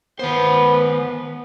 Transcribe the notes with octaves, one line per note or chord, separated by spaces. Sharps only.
D#3 B3 C5